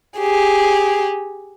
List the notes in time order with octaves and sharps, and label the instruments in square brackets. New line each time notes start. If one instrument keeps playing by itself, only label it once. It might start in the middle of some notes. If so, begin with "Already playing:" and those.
[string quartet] G4 G#4